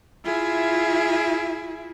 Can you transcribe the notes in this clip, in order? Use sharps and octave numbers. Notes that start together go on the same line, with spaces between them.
E4 F4 G#4 E5